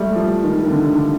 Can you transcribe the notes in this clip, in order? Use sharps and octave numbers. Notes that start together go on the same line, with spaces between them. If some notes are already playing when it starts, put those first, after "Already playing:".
Already playing: G3 A3
F3
D#3
D#3
D3